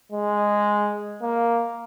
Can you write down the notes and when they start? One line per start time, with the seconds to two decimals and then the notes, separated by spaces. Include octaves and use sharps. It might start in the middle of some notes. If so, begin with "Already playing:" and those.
0.12 G#3
1.22 A#3